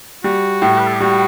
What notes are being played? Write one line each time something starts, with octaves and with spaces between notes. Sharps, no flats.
G3 F#4
A2
B4
A4
G4
G3 F#4